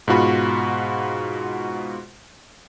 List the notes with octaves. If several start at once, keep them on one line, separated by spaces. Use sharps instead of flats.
G#2 B2 F4 F#4 B5 C#6